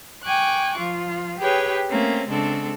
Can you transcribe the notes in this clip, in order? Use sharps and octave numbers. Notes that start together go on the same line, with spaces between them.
G5 G#5 C#6 D6 F#6
F3 F4
G4 G#4 B4 C#5 G5
A3 A#3 C4 C#4
C#3 G#3 C4 D4 A4